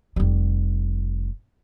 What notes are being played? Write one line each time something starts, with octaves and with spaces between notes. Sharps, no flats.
F1 G3